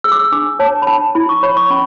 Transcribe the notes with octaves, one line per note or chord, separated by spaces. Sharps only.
G#4 E6
D6
E6
D4 D6
C#5 A5
B5
D4 A5
E4 B5
C#6
C#5 B5
C#6
C#4 B5